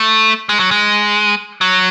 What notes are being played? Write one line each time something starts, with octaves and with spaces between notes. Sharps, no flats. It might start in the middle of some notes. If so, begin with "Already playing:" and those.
Already playing: A3
G#3
F#3
G#3
F#3